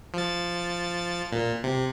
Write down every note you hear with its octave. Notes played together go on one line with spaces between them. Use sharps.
F3 A6
A#2
C3